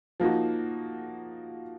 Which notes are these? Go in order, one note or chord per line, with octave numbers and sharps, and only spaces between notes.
F3 A#3 D#4 F#4